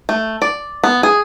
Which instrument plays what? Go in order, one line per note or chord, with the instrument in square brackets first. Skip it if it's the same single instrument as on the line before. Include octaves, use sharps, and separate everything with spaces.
[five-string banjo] A3
D5
B3
G#4